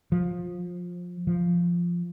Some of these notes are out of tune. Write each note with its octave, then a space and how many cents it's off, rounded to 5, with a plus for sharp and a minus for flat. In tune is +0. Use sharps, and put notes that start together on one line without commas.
F3 +20
F3 -5